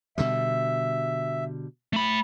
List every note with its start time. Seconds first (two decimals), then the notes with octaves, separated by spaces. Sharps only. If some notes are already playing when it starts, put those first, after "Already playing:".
0.18 B2 D3 G3 E5
1.93 A3 B5